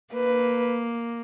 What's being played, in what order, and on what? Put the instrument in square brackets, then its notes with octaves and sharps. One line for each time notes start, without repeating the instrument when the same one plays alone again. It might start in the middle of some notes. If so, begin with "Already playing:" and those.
[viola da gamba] A#3 [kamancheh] B4